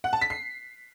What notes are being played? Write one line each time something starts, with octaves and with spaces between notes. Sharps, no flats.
F#5
A5
B6
C7